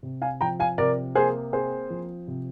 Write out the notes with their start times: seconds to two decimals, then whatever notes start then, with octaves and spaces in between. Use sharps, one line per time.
0.03 C3
0.22 F5 G#5
0.41 F3 G5 A#5
0.60 F5 G#5
0.78 C3 A#4 D5
1.15 A#3 G#4 C5
1.53 C4 G#4 C5
1.90 F3
2.28 C3